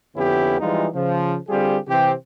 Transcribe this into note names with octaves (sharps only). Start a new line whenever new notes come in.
F2 D3 B3 C#4 E4 G4
E3 F3 G3 G#3 D#4 F4
C#3 F3
D3 G3 C4 F4 G4 G#4
C3 E3 C4 G4